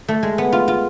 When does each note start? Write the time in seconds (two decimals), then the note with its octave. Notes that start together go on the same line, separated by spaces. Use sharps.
0.08 A3
0.23 G#3
0.38 B3
0.52 F4
0.68 F4